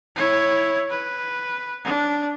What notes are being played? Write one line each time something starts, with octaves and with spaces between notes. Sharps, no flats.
E4 C#5
B4
D4